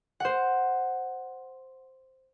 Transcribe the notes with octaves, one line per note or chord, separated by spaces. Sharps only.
C5 F#5